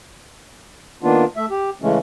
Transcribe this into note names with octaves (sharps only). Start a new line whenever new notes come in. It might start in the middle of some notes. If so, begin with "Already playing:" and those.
D#3 A#3 B3 D4 F4
A3 E5
G4
C#3 E3 G#3 A3 C#4